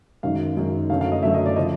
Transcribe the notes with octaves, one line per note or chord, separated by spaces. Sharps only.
F#2 D#3 G#3 F5
F#2 D#3 G#3
F#2 D3 F#3 A3 F5
F5
D#5
F#2 D3 F#3 A3 E5
D#5
D5
C#3 F3 D#5